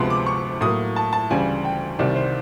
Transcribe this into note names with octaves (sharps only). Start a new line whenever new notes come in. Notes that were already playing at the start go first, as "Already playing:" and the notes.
Already playing: D2 C3 F3 G#3 B3 C6
D6
C#6
A2 F#3 A#3 D#6
A5
A5
D2 C#3 E3 G3 G#5
G5
C2 C3 D#3 G3 D5
C5